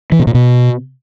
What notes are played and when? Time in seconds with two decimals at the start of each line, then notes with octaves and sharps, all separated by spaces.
0.12 E3
0.19 B2
0.27 A#2
0.34 B2